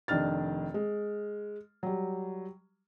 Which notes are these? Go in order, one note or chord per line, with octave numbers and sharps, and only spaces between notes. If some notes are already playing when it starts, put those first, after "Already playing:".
F1 D#3 D4 F6 A6
G#3
F#3 G3